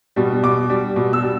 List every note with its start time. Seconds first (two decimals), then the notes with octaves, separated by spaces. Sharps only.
0.16 B2 G3
0.43 B2 D6
0.70 G3
0.96 B2
1.13 E6
1.22 G3